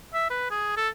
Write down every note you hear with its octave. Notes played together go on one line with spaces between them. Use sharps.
E5
B4
G#4
A4